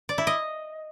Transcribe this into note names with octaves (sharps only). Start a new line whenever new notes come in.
D5
E4
D#5